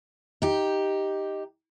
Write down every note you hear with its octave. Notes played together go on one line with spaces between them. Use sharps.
D#4 G4